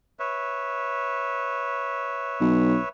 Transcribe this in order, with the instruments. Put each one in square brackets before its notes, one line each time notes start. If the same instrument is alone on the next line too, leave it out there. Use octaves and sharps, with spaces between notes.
[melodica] B4 C#5 E5
[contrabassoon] B1